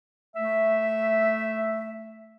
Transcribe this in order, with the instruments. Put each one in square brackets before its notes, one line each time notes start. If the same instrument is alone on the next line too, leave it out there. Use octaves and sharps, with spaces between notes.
[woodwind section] A3 E5